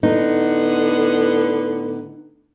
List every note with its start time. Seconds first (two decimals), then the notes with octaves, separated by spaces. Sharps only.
0.03 A2 D3 B3 D#4